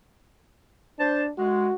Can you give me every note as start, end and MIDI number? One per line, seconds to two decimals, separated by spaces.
0.99 1.31 62
0.99 1.23 72
0.99 1.23 81
1.38 1.69 56
1.38 1.75 66